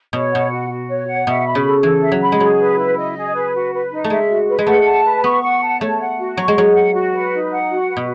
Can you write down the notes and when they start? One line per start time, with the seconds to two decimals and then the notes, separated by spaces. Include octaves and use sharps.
0.13 B2 C#5
0.32 B2 F#5
0.51 F#4
0.69 F#4
0.89 C#5
1.07 F#5
1.27 B2 E5
1.46 B5
1.55 C#3
1.65 A4
1.83 E3 A4
2.02 E5
2.12 F#3
2.22 B5
2.32 G#3
2.40 F#3 G#4
2.59 B4
2.78 E4
2.97 D#5
3.16 G#4
3.34 B4
3.54 F#4
3.73 B4
3.91 D#4
4.04 A3
4.10 G#3 E5
4.29 F#4
4.48 B4
4.59 G#3
4.67 A3 F#5
4.86 A5
5.05 B4
5.24 B3 C#6
5.43 F#5
5.62 A5
5.81 A3 C#5
6.00 F#5
6.19 F#4
6.37 F#3 C#6
6.48 G#3
6.57 F#3 C#5
6.75 F#5
6.94 F#4
7.13 B4
7.32 D#4
7.51 F#5
7.70 F#4
7.89 B4
7.97 B2